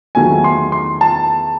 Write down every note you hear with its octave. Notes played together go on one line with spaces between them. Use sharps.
E2 D#3 F#3 A3 G#5
C6
C6
A5